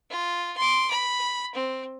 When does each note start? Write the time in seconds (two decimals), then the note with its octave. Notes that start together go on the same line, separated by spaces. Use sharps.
0.10 F4
0.57 C6 D6
0.91 B5
1.55 C4